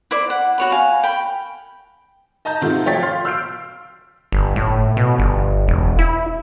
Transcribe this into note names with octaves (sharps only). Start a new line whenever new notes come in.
E4 C5 D5
F#5
F#4 C#5 B5
F5 G#5
G5 B5
D#5 A5 A#5 G6
C3 D#3 A3 F4 F#4
F3 C#5 G5 A6 B6
F5 C6
E6 F6 G6 C7 D7
G1
A2
B2
G1
E1
E4